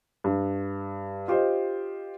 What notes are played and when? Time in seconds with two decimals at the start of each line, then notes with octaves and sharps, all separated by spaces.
0.24 G2
1.28 F4 G4 C5 D#5